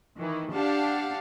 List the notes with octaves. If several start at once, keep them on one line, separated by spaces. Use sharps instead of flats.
D#3 E3
D4 G4 F5 F#5 A5